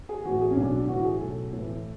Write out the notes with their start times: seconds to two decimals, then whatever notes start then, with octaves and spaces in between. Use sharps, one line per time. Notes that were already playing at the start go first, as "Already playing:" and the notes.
0.09 G#4
0.25 A2 E3 F#4
0.41 G#4
0.51 C#4
0.57 B1 D4
0.73 D4
0.88 A2 E3 F#4
1.05 G#4
1.21 B1 A4
1.53 A2 E3